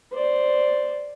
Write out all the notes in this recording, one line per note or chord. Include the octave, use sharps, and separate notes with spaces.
C5 D5